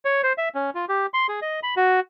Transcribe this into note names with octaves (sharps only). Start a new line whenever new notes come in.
C#5
C5
E5
C#4
F4
G4
C6
G#4
D#5
B5
F#4